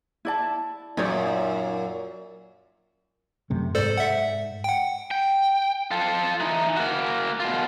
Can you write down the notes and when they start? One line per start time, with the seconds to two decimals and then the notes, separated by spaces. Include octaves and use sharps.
0.25 E4 D5 A5
0.97 F#2 A#2 D#4 C#5 D5
3.50 F#2 C3 A3
3.75 G#2 A4 C5 D5
3.98 E5 F#5
4.64 F#5 G5
5.11 G5
5.91 F4 A4
6.40 E3 D#4
6.77 A#3 F#4
7.40 B2 F4